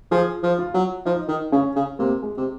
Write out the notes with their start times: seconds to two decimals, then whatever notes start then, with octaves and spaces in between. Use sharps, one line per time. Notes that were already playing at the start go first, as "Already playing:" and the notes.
0.12 F3 G#4
0.43 F3
0.59 F4
0.74 F#3
1.05 F3 D#4
1.28 D#3
1.52 C#3 C#4
1.76 C#3
1.99 C3 A#3
2.23 G#3
2.38 C3